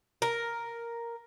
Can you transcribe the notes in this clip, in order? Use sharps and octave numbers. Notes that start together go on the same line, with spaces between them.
A#4